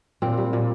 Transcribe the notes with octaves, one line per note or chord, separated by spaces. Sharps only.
A#2 C4
G3
A#2